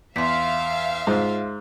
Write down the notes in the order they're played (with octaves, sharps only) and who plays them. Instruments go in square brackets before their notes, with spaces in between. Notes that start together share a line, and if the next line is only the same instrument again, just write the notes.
[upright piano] E2 [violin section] E5 F5 [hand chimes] C6 B6
[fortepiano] G#2 [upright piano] F4